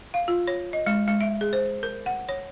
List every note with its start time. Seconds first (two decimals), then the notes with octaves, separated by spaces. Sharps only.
0.14 F5
0.28 F4
0.47 C#5
0.73 D#5
0.86 G#3
1.08 G#3
1.21 E5
1.41 G#4
1.53 C5
1.83 A#4
2.06 F#5
2.29 C#5